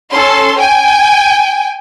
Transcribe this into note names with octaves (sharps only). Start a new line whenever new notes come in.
C#4 A4 C6
G5 G#5